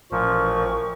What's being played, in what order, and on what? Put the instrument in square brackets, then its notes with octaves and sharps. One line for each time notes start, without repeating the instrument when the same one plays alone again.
[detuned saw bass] A1 [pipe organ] A#2 F3 [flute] A#4 [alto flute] C#6